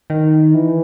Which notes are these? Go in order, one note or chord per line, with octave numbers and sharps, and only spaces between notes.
D#3
E3